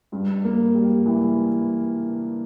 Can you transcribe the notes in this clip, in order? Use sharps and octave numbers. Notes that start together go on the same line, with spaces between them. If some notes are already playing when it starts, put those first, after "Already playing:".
G2
A#3
G3
E3